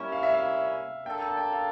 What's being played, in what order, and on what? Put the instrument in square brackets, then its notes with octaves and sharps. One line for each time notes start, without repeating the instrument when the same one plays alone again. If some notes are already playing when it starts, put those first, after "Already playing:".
Already playing: [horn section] A#2 G3 C#4 E4
[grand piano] F5
E5
F5
[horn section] A#3 D4 A4 [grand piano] G5
[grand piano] G5
G5
F5